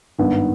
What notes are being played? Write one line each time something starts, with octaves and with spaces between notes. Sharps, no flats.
G#1 G2 D#3 B3